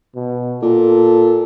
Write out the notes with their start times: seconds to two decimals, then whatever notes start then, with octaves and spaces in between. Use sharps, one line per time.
0.15 B2
0.62 A#2 A4